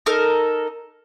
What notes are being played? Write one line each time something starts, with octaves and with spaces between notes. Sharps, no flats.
D#4 A4 A#4